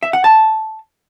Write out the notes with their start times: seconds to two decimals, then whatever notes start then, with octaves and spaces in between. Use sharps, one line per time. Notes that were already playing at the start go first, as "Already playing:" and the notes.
0.03 E5
0.13 F#5
0.24 A5